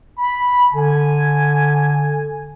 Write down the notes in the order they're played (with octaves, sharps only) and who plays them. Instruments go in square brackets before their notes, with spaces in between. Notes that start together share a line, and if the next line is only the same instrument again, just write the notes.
[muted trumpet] B5
[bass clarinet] D3 [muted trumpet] G#5